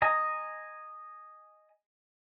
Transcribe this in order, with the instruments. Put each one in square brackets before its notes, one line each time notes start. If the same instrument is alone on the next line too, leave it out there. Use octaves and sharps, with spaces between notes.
[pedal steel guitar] D#5 G#5 A#5